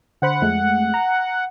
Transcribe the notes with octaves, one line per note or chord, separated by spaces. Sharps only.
D3 C5 F#5 B5
F2 G#3 A3
A#5